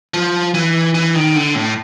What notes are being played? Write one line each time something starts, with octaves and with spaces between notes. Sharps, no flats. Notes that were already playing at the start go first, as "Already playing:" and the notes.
F3
E3
E3
D#3
D3
A2